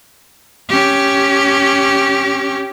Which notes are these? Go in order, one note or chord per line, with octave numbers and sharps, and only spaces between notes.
C#4 G4